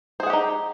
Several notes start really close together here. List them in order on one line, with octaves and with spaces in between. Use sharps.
C5 G#4 F#5 G4 D#4